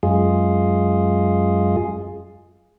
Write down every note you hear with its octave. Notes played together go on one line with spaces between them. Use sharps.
F#2 G#3 F4 G#4